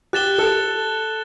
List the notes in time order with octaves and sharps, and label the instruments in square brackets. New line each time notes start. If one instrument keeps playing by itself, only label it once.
[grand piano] G4 [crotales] F#6 A6 E7 G7
[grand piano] A4